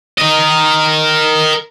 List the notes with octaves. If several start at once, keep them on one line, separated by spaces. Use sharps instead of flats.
A#4 D#5